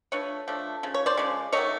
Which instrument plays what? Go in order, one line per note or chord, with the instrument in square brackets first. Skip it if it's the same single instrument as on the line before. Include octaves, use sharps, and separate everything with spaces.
[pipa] F3 A3 D4 B4 C#5
F3 A3 D4
C#3 F3
C#5
C5 D5
C#3 F3 G#3
D#3 F#3 A3 C#5 D#5